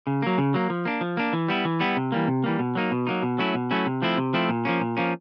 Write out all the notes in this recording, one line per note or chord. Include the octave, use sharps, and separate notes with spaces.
C#3
F#3 A#3
C#3
F#3 A#3
F3
A#3 D4
F3
A#3 D4
E3
G3 B3 E4
E3
G3 B3 E4
C3
E3 G3 A#3
C3
E3 G3 A#3
B2
F#3 A#3 D#4
B2
F#3 A#3 D#4
B2
F#3 A3 C#4 E4
B2
F#3 A3 C#4 E4
C3
F3 A3 C4 E4
C3
F3 A3 C4 E4
A#2
F3 A#3 C#4
A#2
F3 A#3 C#4